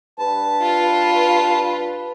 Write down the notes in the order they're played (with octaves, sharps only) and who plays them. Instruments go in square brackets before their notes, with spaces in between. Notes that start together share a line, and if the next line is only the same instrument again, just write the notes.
[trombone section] G2 B4 [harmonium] A5
[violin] F4